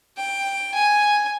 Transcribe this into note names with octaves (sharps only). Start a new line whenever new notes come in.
G5
G#5